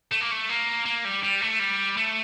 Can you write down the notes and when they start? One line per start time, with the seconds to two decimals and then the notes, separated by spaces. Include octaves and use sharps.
0.12 A3
0.21 A#3
0.31 A3
0.49 A#3
0.86 A#3
1.05 G3
1.23 G3
1.41 A3
1.60 G3
1.97 A3